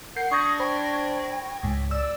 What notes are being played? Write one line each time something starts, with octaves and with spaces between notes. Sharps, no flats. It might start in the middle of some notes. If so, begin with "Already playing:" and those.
A#4 F#5 G6 C7
D4 C#6 D#6 G#6 A#6
C5 G5 B5
C#2 G#2
D5 E6